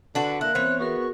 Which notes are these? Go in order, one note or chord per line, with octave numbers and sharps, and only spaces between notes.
D3 D4 F#4 B4
A#3 E4 A#4 F5 F#6
E3 B3 C4 C5 C#5
B3 F#4 G#4 A#4 C#6